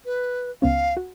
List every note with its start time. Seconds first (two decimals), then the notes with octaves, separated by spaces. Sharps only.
0.05 B4
0.62 C#2 B3 C#4 F5
0.97 F#4